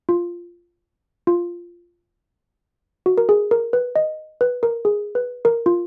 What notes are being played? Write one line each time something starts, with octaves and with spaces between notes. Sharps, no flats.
F4
F4
F#4
A#4
G#4
A#4
B4
D#5
B4
A#4
G#4
B4
A#4
F4